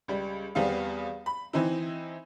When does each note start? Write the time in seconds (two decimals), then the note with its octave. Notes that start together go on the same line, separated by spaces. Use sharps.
0.08 C#2 G3
0.55 E2 G3 B3 C4 F5
1.26 B5
1.53 E3 C4 D#4 E4